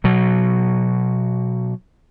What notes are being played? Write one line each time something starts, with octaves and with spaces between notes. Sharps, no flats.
B2 F#3